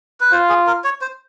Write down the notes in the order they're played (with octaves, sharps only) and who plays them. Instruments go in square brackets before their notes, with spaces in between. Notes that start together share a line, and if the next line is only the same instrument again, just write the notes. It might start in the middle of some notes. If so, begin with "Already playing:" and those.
[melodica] B4
[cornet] F4 [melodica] C5
[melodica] G#4
A#4
C#5
C5